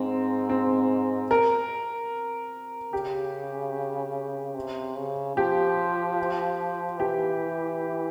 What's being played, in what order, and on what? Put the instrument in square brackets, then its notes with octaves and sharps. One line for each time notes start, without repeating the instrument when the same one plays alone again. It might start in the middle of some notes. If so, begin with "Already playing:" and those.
Already playing: [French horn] G#2 [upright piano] C4
[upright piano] C4
A#4
[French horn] C#3 [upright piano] G4
[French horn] C3
C#3
[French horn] F3 [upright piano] G4
[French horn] E3 [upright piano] G4